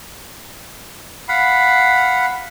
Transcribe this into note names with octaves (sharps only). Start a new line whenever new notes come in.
F5 F#5 B5